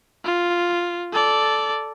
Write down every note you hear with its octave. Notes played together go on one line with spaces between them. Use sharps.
F4
A4 D5